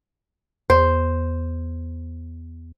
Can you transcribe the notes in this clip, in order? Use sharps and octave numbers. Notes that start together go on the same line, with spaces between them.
E2 C5